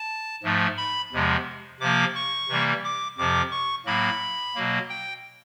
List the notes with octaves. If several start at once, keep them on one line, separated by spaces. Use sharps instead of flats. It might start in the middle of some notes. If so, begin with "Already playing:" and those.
Already playing: A5
G#2 F3 A3
B5
E2 C3 F3 G#3
C3 F3 A#3 D6
C#6
C3 E3 G3 A#3
D6
F2 C3 F3 D6
C#6
A2 F#3 A#3 B5
B2 F#3 A#3
G5